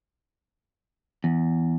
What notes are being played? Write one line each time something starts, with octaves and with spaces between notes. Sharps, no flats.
E2